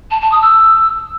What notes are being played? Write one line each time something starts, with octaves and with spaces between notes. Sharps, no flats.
A5
A5
D#6
E6